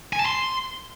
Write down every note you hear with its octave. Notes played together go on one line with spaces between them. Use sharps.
G#5
A5
C6